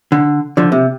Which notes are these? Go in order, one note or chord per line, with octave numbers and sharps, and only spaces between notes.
D3
D3 F3
C3